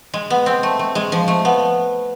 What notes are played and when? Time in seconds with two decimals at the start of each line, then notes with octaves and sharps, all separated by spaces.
0.14 G#3
0.30 B3
0.46 C4
0.63 A3
0.79 A3
0.95 G#3
1.12 F3
1.28 A3
1.45 B3